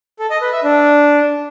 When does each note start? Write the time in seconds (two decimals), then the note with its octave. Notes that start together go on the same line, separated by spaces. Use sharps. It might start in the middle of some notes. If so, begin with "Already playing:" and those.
0.19 A4
0.30 D#5
0.41 B4
0.52 E5
0.63 D4